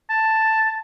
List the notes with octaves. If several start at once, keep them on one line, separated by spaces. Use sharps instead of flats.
A5